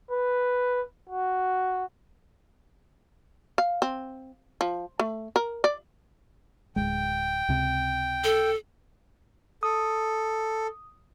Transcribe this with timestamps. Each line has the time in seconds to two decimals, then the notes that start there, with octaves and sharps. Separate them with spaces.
0.11 B4
1.09 F#4
3.58 F5
3.82 C4
4.61 F3
5.00 A3
5.36 A#4
5.64 D5
6.76 D1 B1 G#3 G5
7.49 C#2 C3
8.24 A4
9.63 A4 D#6